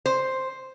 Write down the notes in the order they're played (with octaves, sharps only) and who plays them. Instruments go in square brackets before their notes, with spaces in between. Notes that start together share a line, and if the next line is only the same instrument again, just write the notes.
[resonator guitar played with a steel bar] C5